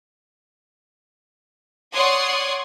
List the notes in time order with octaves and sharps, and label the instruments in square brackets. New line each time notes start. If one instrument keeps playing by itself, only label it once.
[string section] C#5 D5 F#5 C6 D#6 G#6